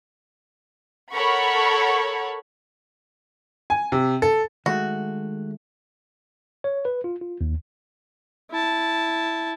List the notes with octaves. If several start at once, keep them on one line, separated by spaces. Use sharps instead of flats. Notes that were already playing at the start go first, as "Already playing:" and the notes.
A4 A#4 C#5 F#5 B5 C#6
G#5
C3
A4
D#3 G#3 A3 F#4
C#5
B4
F4
F4
D#2
E4 A5